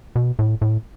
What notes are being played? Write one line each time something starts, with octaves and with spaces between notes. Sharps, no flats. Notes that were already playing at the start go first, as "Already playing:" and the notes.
B2
A2
A2